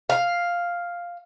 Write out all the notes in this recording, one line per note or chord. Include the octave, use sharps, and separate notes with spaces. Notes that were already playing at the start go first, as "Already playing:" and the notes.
F5